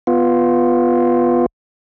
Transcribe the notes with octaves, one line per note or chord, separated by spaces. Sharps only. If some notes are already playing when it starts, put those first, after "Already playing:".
B3 F4